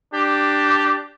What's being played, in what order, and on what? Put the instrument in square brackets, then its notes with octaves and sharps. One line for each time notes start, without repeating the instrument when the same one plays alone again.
[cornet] D4 [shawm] G4